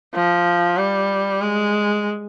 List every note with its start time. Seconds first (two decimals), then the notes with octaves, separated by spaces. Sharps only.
0.14 F3
0.77 G3
1.42 G#3